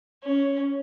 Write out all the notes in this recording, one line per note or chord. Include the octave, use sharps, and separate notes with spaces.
C#4